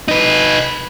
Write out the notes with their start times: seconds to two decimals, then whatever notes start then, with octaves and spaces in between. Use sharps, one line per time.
0.08 D#4 B4